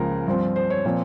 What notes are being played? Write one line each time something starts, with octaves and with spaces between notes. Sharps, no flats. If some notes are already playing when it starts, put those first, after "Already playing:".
Already playing: C#2 C#3 F3 A#3 A#4
G2 F3 C4
C5
C#5
A#2 F3 C4